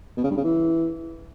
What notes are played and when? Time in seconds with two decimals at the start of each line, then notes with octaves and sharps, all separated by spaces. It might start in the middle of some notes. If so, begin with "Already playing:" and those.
0.17 B2
0.23 C#3
0.30 G2
0.37 C#3
0.44 E3